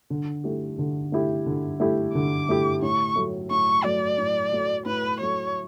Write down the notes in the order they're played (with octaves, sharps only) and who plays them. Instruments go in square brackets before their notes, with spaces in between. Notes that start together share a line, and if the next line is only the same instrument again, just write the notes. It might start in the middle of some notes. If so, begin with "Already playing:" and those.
[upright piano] D3
A3 E4 G4
D3
A3 E4 G4
D3
A3 E4 G4
[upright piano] D3 [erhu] D6
[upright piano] A3 E4 G4
[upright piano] A2 [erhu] C#6
[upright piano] F#3 A3
[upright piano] A2 [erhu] C#6
[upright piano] F#3 A3 [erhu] D5
[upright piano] A2
F#3 A3
[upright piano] A2 [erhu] B4
[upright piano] F#3 A3 [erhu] C#5